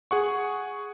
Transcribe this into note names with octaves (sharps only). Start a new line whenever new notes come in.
G#4 F#5 C#6